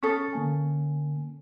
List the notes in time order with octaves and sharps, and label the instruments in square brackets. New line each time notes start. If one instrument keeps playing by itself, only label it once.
[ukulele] C#4 A4 [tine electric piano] C#6 D#6 A6
[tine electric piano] D3 A#3 G#5